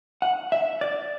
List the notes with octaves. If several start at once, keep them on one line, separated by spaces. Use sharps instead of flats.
F#5
E5
D5